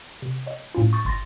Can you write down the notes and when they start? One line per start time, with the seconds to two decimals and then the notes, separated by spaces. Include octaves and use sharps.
0.22 C3
0.46 C#5 D#5
0.75 A2 C#4 F4
0.93 C#6 D#6 G6 A6
1.05 G1 C6 A6 A#6